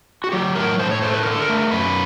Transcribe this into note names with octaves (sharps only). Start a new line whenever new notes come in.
F#4
F#3 G4
A2 A#4
A2 C5
C#5
A3 C5
B4
D3 A#4
A4
A#4
A3
F#2 B4